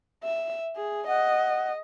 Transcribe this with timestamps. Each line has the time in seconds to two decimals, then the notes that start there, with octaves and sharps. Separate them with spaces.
0.23 E5
0.76 G#4
1.07 D#5 F#5